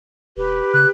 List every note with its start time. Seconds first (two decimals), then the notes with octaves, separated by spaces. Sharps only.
0.37 E1 G4 B4
0.74 C#3 F#6